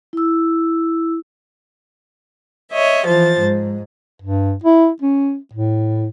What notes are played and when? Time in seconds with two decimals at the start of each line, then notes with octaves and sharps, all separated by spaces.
0.13 E4 E6
2.71 C#5 D#5 E5
3.06 E3 F3 C5 A6
3.40 G#2
4.22 G2
4.64 E4
5.02 C#4
5.53 A2